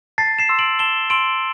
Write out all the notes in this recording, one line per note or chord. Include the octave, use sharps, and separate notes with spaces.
A5 A6 C7
C7 E7
C6 E6
D7 F#7
A5 E7 G7
C6 E6 D7 F#7